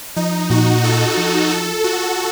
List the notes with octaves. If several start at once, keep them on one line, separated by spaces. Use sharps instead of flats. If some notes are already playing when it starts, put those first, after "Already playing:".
F3 D#4
A#2 F#4
F4 A4
F3
F4 A4
F4 F#4